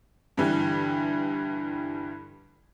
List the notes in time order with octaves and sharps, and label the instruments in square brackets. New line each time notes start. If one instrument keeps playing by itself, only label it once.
[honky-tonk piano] G2 D3 E3 G3